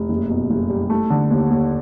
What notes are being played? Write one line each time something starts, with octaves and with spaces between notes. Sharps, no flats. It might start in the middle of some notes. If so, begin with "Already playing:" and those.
Already playing: F1
F#1
B2
F#1
G3
A3
D3
D#2
D#2